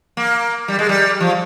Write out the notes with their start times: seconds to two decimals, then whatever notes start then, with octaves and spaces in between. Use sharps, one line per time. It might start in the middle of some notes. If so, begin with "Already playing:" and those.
0.17 A#3
0.68 G3
0.79 G#3
0.89 G3
1.20 F3